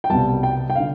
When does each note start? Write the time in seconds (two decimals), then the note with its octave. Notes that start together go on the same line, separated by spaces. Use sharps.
0.04 G5
0.10 C2 B2 G3 A5
0.43 G5
0.70 G5
0.75 D3 F5